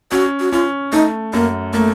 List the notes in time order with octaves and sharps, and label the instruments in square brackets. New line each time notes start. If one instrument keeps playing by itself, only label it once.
[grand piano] C#4 [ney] F#4
[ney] F#4
[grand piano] C#4 [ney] F4
[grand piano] A3 [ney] D#4
[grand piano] F#2 [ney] A#3
[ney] A3 [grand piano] A#3